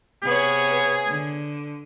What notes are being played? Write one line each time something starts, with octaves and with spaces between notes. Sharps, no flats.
C3 B3 G#4 C#5
D3